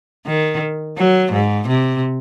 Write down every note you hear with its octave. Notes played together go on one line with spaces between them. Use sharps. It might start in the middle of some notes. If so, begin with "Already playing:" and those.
D#3
F#3
G#2
C3